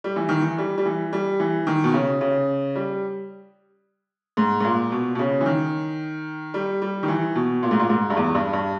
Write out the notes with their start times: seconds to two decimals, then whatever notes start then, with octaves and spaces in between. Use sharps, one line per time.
0.04 G3
0.16 E3
0.29 D#3
0.41 E3
0.58 G3
0.78 G3
0.85 E3
1.13 G3
1.40 E3
1.67 D#3
1.84 B2
1.94 C#3
2.21 C#3
2.75 G3
4.37 G#2
4.60 G#2
4.64 A#2
4.92 B2
5.15 B2
5.19 C#3
5.41 E3
5.46 D#3
6.54 G3
6.82 G3
7.03 D#3
7.08 E3
7.35 B2
7.63 A#2
7.71 G#2
7.79 A#2
7.89 G#2
8.10 G2
8.17 E2
8.35 G2
8.53 G2